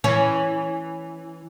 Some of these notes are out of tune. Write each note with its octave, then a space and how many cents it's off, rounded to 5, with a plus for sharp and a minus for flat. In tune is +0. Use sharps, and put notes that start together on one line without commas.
E3 +0 C#4 +0